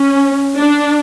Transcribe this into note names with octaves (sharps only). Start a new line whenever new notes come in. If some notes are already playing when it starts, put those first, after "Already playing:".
Already playing: C#4
D4